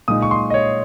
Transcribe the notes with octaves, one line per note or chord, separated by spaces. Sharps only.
A#2 G#3 D#4 D#6
C#6
C6
D#5
C#5